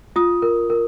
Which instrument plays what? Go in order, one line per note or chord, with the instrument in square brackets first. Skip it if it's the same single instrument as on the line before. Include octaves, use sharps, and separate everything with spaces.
[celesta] F4 D#6
A#4
A#4